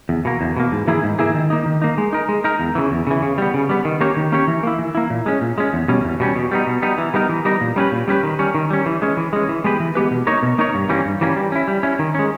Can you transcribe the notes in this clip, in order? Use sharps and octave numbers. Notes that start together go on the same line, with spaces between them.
E2
B2 A#3
E2
B2 A#3
G#2
E3 A#3 E4 G#4
G#2
E3 A#3 E4 G#4
D#3
A#3 D#4
D#3
A#3 D#4
G#3
D#4 A#4
G#3
D#4 A#4
E2
C#3 E3
E2
C#3 E3
C#3
G3 B3
C#3
G3 B3
D#3
A#3 C#4 G4 C#5
D#3
A#3 C#4 G4 C#5
E3
A#3 E4
E3
A#3 E4
A#2
G#3 C#4
A#2
G#3 C#4
E2
B2 G3 C#4
E2
B2 G3 C#4
B2
G3 B3 D#4
B2
G3 B3 D#4
E3
G3 B3 D#4 A#4
E3
G3 B3 D#4 A#4
A#2
G3 C#4 G4 B4
A#2
G3 C#4 G4 B4
D#3
G3 C#4
D#3
G3 C#4
E3
G#3 C#4
E3
G#3 C#4
E3
G#3 B3 G4 B4
E3
G#3 B3 G4 B4
B2
A#3 D#4 A#4 C#5
B2
A#3 D#4 A#4 C#5
G2
E3 G3 A#3 C#4
G2
E3 G3 A#3 C#4
G3
C#4 E4
G3
C#4 E4
D#3
G#3 C#4